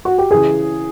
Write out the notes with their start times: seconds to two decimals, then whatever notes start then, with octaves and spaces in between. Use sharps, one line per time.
0.05 F#4
0.18 G4
0.31 C#3 E3 G#4